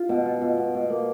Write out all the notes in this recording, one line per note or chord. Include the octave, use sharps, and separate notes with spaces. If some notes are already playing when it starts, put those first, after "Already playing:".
Already playing: F4
B2
F4
B2
B2
B2
A#3